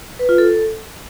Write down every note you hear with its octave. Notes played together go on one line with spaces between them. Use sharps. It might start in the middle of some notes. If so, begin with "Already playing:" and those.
B4
F4
A4